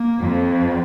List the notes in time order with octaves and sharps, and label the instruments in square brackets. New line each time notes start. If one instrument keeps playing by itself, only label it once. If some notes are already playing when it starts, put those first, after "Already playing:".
Already playing: [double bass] A#3
[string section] F2